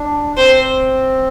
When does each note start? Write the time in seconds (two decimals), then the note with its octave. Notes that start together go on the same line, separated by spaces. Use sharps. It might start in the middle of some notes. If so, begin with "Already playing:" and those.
Already playing: D4
0.37 C4 C5